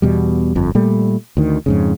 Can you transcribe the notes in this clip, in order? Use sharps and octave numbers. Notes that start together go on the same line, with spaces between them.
E2 B2 G3
G1 F2
A#2 G3 A3
D2 D#3
F2 G#2 C#3